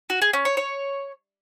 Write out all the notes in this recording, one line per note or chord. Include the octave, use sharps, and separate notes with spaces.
F#4
G#4
C#4
C#5
C#5